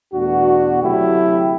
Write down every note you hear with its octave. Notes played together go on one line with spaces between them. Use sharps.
E2 B2 A3 D4 F#4
D2 C3 F#3 A3 E4 G4